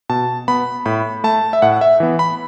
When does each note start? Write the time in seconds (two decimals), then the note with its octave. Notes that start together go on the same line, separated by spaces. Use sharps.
0.09 B2 A5
0.48 B3 B5
0.86 A2 B5
1.24 A3 A5
1.53 E5
1.62 A2 F#5
1.81 E5
2.00 E3 B3
2.19 B5